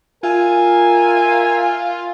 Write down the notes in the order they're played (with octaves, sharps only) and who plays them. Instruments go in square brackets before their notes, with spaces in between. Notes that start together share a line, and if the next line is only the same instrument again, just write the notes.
[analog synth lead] F4 [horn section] A#4 E5 G#5